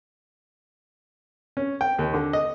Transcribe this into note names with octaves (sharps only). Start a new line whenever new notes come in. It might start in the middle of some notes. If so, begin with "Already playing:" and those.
C#4
G5
D#2
D3
D#5